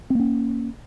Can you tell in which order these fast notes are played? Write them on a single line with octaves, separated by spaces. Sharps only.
C4 A#3 C#4